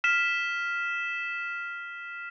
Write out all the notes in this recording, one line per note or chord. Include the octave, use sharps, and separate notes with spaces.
F6 B6 E7